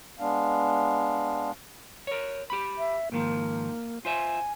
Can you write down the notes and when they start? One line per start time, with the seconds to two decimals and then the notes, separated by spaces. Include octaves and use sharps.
0.19 G#3 B3 D4 F5
2.07 A#4 C#5
2.50 G4 B5
2.78 E5
3.12 G#2 D#3 F3 A#3
4.05 F4 C5 E5 G#5